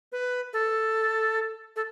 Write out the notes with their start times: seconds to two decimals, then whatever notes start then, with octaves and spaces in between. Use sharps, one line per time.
0.12 B4
0.53 A4
1.76 A4